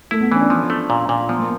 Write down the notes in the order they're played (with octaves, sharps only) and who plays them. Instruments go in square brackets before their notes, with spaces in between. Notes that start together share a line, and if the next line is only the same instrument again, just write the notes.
[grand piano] A3 [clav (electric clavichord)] E4
[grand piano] B3
[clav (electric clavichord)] E3 [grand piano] C#4
[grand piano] D4
[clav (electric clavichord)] F3
A3
A#2
A#2
[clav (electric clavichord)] F3 [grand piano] B3
[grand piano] A#3